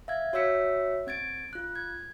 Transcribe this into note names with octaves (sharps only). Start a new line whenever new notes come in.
E5 F5 G#6
F#4 C#5 E5 E6 B6 C#7
C4 G#6 A6 D7
F4 F#6
G#6